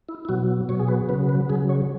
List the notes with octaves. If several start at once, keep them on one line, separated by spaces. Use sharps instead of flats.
E4
E4
B2 F#3 F#4
B2 F#3 C#5
G#4
B4
C#3 F#3 B4
B4
C#3 F#3 G#4
C#5